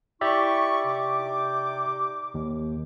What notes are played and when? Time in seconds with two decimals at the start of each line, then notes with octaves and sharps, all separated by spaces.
0.21 E4 G4 D5 E5 C#6
0.85 C3 D#4 D6
2.34 D#2